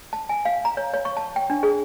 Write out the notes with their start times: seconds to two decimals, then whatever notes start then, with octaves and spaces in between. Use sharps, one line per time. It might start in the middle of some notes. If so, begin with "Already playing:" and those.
0.13 A5
0.29 G#5
0.45 F5
0.65 A#5
0.77 C#5
0.93 C#5
1.05 C#6
1.17 A5
1.36 G5
1.50 D4
1.63 G#4